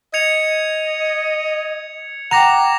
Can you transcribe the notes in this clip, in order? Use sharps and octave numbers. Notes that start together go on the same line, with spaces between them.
D#5 G#6 C#7 F7
F#5 G5 A#5 D6 A#6 F7